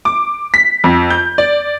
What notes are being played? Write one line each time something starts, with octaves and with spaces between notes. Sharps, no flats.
D6
B6
F2
G6
D5